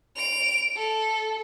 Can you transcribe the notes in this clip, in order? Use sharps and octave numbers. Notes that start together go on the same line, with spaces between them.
D7 F7
A4